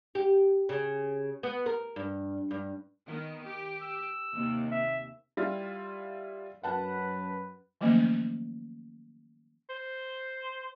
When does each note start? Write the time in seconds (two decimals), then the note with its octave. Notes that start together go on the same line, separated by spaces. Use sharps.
0.15 G4
0.69 C#3
1.43 B3
1.66 A#4
1.96 G2
2.51 G2
3.07 D#3 B3
3.45 G4
3.82 E6
4.33 D#2 C3
4.71 E5
5.37 G3 E4 F4
6.63 F#2 B4 F#5 A5 F#6
7.81 D#3 F3 F#3 A3 A#3 C#4
9.70 C5